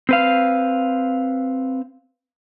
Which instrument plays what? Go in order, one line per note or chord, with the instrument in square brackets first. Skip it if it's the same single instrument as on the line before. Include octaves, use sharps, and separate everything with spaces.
[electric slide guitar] C4 B4 F5